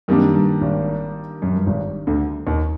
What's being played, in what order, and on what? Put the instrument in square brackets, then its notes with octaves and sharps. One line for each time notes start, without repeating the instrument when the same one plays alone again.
[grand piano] F#2 [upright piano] D#3 G3 A#3 D4
[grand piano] G2
G#1 G#2
F#2
G2
G#1 G#2
D2 D3
D#2 D#3